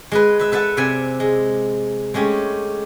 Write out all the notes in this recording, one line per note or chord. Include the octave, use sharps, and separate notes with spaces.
G#3 G#4 B4
B4 E5
A4 B4 E5 F#5 A5
C3 D5 E5 G#5
G#3
G#3 A3 C#4 G4